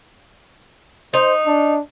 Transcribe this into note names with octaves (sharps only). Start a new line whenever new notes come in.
D#4 C5
D4